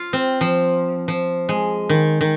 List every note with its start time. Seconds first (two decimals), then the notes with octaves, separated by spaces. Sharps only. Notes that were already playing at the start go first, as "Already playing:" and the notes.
Already playing: F4
0.13 C4
0.41 F3
1.08 F3
1.49 G#3
1.89 D#3
2.21 D#3